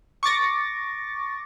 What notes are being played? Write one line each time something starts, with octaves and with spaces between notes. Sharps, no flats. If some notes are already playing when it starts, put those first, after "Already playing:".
C#6 D6 A6 A#6